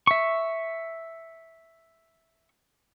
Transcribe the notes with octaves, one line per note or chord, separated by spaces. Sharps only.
E5 C#6